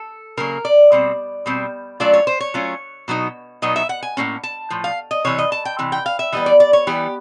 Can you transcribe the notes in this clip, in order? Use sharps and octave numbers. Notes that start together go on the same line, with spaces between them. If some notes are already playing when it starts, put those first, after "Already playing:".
Already playing: A4
C#3 F#3 A#3 A#4
D5
B2 G3 C4
B2 G3 C4
F#3 A3 C#4 F4 D5
C#5
C5
C#5
F#3 A3 C#4 F4
B2 F#3 B3 D#4
B2 F#3 B3 D#4 D#5
E5
F#5
G#5
A2 F3 A#3 C#4
A5
A2 F3
F5
D#5
C3 E3 G3 C#5
D#5
A5
G5
C3 E3
G5
F5
E5
E3 G3 B3 D#5
D5
D5
C#5
E3 G3 B3 G4